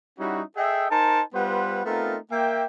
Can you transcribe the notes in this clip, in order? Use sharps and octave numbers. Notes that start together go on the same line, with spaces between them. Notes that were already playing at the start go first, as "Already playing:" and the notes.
G3 C#4 D#4 E4 F#4
G#4 A4 D#5 E5 G5
D#4 A#4 C5 G#5 A5
G3 B3 F4 B4 C5 F#5
A3 B3 C4 D#4 F4 A#4
A#3 E5 G5